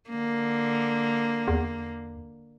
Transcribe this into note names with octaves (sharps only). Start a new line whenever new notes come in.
D3 A#3
E2